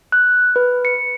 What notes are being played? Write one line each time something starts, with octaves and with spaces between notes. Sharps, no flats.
F#6
B4
C#7